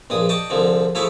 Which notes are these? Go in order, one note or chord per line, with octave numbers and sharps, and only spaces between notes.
A#1 G2 G#3 D#6
D5 D#5 G5 A5 C#6
C2 D3 F3 G#3
F3 A3 E4 G4 G#4 C#5